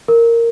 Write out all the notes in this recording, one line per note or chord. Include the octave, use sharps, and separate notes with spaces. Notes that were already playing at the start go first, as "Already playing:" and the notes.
A#4